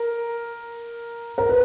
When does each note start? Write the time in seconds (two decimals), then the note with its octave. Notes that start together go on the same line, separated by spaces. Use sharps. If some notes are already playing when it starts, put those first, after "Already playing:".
Already playing: A#4
1.38 A#4
1.49 B4